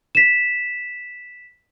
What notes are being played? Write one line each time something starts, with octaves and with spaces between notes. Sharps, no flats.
B6 E7